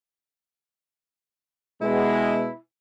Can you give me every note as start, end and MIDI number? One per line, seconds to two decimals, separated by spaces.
1.81 2.48 47
1.81 2.48 56
1.81 2.48 59
1.81 2.57 64